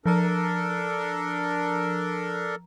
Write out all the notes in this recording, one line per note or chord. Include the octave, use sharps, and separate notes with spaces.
F3 D4 A4 A#4 A#5